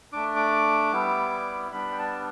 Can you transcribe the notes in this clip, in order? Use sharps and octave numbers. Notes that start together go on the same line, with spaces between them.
A3 D4 D6
D6
G3 B3 E4
G3 B3 D4 B5
G5
A5